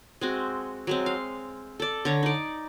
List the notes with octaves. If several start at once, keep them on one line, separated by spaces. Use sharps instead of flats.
G#3 C4 F#4
F#3 G#3 C4
F5
A4 D5
D3 C#5 A#5
D#4 D5